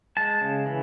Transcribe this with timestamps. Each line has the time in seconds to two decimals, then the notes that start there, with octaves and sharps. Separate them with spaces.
0.17 G#3 A5
0.41 C#3
0.66 E3